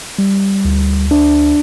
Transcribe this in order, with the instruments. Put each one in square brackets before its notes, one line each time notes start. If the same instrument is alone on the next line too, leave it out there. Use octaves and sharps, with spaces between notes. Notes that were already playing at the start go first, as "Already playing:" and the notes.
[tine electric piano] G3
D2
D4